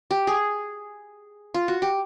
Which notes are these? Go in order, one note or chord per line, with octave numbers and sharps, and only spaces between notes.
G4
G#4
F4
F#4
G4